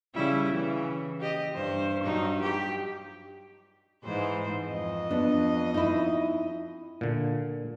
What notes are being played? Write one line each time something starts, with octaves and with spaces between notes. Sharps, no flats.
C#3 G3 E4
C#3 E3
G4 D#5
G2 C5
G2 F#3 D#4
G4
G#2 E3 C5
F2 D#5
B3 D4
D#4 E4
A#2 D3